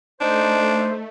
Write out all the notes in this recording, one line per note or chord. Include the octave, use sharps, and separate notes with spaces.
A3 D4 D#4 C5